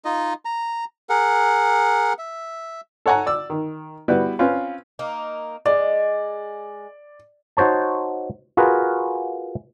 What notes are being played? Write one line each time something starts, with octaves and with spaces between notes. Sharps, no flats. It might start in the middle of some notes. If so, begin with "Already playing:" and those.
D#4 F4 D#5
A#5
G#4 A#4 F#5
E5
A4 C#5 F#5 G#5 A#5
D5 E6
D#3
G3 B3 E4 F#4 B4
C4 C#4 F4 B4
A#3 D#4
G#3 D5
D#4 F#4 C5 C#5 A5
F4 F#4 G#4 A#4 B4